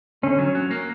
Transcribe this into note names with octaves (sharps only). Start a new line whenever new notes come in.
D3 C#4
F#3
F#3
A#3